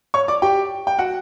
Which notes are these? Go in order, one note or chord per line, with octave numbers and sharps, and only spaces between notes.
C#5 C#6
D5 D6
G4 G5
G5
F#4 F#5